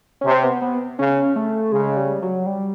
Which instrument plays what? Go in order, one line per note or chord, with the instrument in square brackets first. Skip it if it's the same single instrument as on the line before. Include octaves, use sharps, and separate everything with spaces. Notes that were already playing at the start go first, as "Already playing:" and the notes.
[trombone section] C3 [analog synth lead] C#4
[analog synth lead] C4
B3
B3
[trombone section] C#3 [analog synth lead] C#4
[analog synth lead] A3
[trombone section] C#3 [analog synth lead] G#3
[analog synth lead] G3
F#3
G3